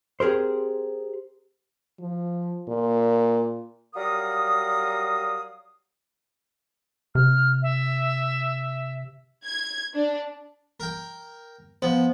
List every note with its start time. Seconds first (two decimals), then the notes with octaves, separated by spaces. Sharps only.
0.20 C4 G4 G#4 A#4 C5
1.99 F3
2.68 A#2
3.95 F#3 G3 A#4 F5 D#6
7.15 C3 F6
7.62 E5
9.44 G#6
9.94 D4
10.80 A#4 G5
11.82 F3 B3 C5